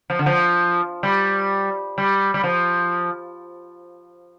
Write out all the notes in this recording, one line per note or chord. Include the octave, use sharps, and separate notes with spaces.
F3
D3
F3
G3
G3
G3
F3